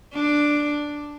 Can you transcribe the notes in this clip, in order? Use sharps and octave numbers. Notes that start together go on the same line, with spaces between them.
D4